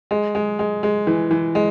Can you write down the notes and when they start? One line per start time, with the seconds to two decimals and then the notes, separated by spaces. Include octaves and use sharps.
0.11 G#3
0.35 G#3
0.59 G#3
0.83 G#3
1.07 E3
1.31 E3
1.55 G#3